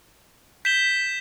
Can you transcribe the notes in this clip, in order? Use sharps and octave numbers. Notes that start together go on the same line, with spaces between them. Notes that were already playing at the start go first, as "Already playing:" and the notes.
G6 B6 E7 G7